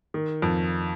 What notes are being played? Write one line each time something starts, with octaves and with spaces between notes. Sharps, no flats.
D#3
F2